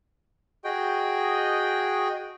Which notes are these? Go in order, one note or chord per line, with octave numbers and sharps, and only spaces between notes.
F#4 G#4 D#5 G5